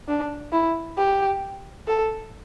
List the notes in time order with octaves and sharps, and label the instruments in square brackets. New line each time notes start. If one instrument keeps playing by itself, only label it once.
[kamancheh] D4
E4
G4
A4